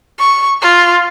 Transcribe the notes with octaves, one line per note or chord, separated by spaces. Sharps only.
C#6
F4